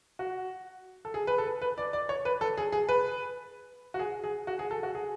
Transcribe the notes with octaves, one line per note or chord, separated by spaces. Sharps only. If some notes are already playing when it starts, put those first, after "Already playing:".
F#4
A4
G#4
B4
A4
B4
D5
D5
C#5
B4
A4
G#4
G#4
B4
F#4
G#4
G#4
F#4
G#4
A4
F#4
G#4